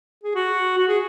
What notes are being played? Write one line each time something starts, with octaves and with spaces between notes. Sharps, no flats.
G#4
F#4
F#4
G#4